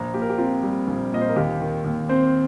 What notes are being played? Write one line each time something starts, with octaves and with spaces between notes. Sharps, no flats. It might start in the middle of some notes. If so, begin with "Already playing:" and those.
Already playing: A#1 A#5
A#2 G4
A#4
G4
C4 F4
G3
A#1
A#2 D#5
C5
A#4
D#2 G4
D#3
D#2
C4 C5